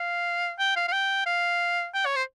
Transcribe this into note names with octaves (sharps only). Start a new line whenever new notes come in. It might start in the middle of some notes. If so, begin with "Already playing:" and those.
Already playing: F5
G5
F5
F5
G5
F5
G5
C#5
C5